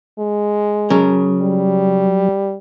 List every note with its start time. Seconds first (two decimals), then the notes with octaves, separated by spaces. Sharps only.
0.19 G#3
0.90 C#3 F#3 A#4
1.42 G3